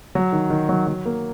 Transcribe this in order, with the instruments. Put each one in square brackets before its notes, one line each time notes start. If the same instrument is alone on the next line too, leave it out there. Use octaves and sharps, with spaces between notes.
[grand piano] F#3
D#3
D#3
F#3
F#3
A#3